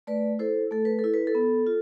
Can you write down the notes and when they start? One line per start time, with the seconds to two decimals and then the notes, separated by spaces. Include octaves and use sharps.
0.07 A3 B4 D5
0.39 E4 A4 C5
0.71 A3 A4
0.85 B4
0.99 A4
1.04 E4
1.14 B4
1.27 A4
1.35 B3
1.67 F4